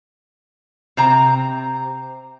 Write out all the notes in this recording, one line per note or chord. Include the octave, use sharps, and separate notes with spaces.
C3 C4 A#5